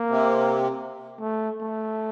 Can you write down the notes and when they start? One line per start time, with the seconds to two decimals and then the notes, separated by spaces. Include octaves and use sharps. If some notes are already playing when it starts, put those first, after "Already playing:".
Already playing: A#3
0.10 C3
1.20 A3
1.61 A3